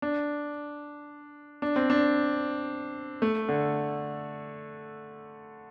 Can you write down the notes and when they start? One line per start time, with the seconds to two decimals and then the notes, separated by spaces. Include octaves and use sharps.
0.02 D4
1.62 D4
1.76 C4
1.90 D4
3.22 A3
3.49 D3